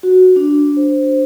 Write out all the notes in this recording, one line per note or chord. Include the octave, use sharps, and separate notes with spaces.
F#4
D4
C5